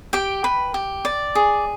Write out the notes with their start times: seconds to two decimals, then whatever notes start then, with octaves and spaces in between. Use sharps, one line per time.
0.13 G4 G5
0.44 B4
0.74 G4
1.05 D5
1.35 G#4